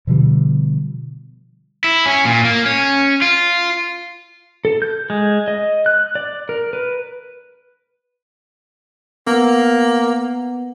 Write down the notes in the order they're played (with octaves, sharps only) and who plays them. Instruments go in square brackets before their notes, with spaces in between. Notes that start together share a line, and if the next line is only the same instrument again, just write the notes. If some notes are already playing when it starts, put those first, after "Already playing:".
[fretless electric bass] B2 D3 F3 G3
[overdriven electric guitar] E4
C#4
A#2
A#3
C#4
F4
[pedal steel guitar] A4
G6
G#3
D#5
F#6
D5
A#4
B4
[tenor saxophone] A#3 [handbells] B3